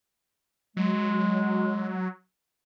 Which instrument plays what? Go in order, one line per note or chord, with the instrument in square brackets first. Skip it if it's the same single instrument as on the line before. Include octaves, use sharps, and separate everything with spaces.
[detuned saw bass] F#3 [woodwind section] G#3